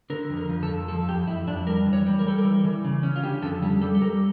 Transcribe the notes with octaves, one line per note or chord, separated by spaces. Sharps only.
D3 A#4
F2
A#4
F3
A4
F2
F3 A4
F2 G4
F2 E4
F2 D4
G3 A#4
E3
C#5
G3
A#4
G3 A4
A#4
E3
E3
C#3
C#4
F4
D3 G4
F2 A4
G3
G3 A4
A4
G3 A#4